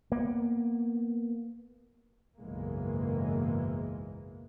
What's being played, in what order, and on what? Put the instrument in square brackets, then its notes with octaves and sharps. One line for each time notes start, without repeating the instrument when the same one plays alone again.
[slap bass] A#3 B3
[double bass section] F#1 B1 G#2 E3 G#3 A#3